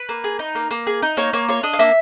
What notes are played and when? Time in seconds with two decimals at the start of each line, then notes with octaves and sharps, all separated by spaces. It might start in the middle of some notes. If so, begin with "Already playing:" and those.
Already playing: B4
0.09 A#3
0.24 G#4
0.39 D#4
0.55 A#3
0.71 A#3
0.87 G#4
1.02 D#4
1.17 A#3 C#5
1.33 A#3 C#5
1.48 F4 C#5
1.63 D4 D#5
1.73 F5
1.79 A#3 E5